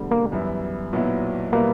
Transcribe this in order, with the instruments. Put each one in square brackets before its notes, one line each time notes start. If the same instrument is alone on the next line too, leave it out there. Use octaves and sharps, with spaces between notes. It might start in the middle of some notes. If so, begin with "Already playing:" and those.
Already playing: [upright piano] E1 D2 D3 G3
[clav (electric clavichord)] A#3
[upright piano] F#2 E3 G3 B3 E4
B1 A#2 F#3 B3 E4
[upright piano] B2 G3 B3 E4 [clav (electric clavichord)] A#3